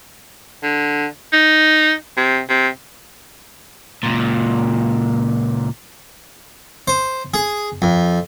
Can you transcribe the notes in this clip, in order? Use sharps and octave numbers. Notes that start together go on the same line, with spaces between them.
D3
D#4
C3
C3
C#2 A#2
C5
G#4
F2